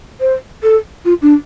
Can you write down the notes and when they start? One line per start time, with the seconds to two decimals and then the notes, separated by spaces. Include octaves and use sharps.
0.20 C5
0.63 A4
1.05 F4
1.22 D4